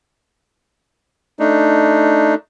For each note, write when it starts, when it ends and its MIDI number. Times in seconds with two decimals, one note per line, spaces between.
1.39 2.35 57
1.39 2.35 62
1.39 2.35 63